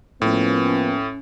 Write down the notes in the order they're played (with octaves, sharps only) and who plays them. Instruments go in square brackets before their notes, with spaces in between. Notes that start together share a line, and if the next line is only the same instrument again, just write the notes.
[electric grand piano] A2 [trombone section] F3 A#3 B3 [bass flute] C#4